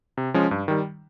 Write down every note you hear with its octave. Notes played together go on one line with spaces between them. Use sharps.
C3
F3 G#3 C#4
G2
D#3 G3